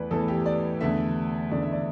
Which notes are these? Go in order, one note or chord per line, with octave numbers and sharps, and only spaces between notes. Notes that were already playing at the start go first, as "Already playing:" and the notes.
Already playing: E2 E3 A3 B4 D5
E2 E3 A3 A4
G4
D5
E2 D3 A3 E5
E2 D3 A3 D5
E5
D5